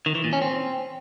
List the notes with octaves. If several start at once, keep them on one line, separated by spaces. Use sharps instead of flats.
D#3
E3
A#2
C#4
C4